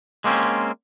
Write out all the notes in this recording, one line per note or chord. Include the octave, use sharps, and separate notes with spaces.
G#3 A#3 C4 C#4